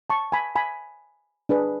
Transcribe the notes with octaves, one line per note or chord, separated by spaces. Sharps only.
A5 C#6
G#5 B5
G#5 B5
D4 G#4 B4